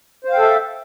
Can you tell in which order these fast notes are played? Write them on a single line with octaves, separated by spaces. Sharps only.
C5 F5 G5 A4 E5